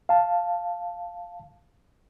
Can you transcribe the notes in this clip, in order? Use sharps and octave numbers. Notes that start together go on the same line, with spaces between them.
F5 A5